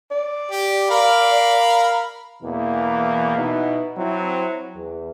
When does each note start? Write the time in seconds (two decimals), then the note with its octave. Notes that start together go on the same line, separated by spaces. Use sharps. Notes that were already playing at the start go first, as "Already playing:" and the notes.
0.11 D5
0.51 G4
0.90 A#4 F5 B5
2.43 E2 B2 E3 A#3
3.38 B2 B3 D#4 E4
3.97 F#3 C4 E4
4.75 E2